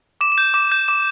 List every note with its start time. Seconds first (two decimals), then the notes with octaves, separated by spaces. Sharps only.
0.21 D6 E7
0.32 E7
0.38 G6
0.54 D6 E7
0.71 G6 E7
0.88 D6 E7